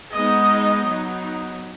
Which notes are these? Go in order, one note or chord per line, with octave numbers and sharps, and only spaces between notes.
G#3 B3 D#4 D#5
F#3 B3 D#4